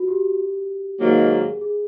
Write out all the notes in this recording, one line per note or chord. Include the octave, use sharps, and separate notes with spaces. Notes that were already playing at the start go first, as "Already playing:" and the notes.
Already playing: F4 F#4
G4
G#2 D#3 F#3 A#3 G#4
G#4